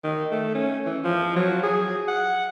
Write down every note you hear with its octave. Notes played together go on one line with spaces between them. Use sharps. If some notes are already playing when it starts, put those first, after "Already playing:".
D#3
A3
C#4
E3
F3
F#3
G#4
F#5